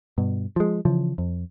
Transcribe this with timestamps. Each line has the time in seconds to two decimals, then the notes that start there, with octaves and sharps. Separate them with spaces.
0.18 G2 B2
0.56 F3 G#3
0.85 C#3 E3 F3
1.18 F2